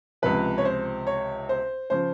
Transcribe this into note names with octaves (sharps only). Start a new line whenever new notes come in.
C#2 C3 F3 B4
C#5
C5
C#5
C5
C#3 F3 C5